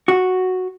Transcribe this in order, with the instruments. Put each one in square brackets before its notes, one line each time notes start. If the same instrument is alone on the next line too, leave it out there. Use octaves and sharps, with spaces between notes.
[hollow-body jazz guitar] F#4